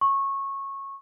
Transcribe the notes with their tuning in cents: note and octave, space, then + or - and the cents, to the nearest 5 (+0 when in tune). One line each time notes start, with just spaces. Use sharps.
C#6 -15